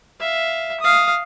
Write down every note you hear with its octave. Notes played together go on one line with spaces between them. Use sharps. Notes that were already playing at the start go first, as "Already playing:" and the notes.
E5 F5
F5 D#6